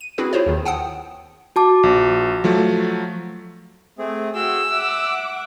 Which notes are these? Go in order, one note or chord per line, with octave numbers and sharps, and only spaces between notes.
D#7
C4 E4 F#4 G#4 B4
E4 F4 G#4 C5 C#5
D#2 D#3
F#5 G5 A5 D#6
F#4 A5 D6
A#1
F3 F#3 A3
A3 C4 G#4
F#4 G#4 G5 E6
E5 F#5 D6